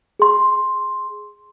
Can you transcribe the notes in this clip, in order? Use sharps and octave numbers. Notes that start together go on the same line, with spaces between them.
G#4 C6